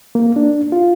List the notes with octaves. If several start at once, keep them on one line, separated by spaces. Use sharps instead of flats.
A#3
D4
F4